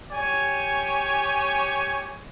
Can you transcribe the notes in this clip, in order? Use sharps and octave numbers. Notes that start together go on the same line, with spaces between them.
G4 C#5 G#5